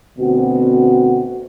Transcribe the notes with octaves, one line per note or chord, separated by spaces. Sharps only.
D2 B2 C4 F#4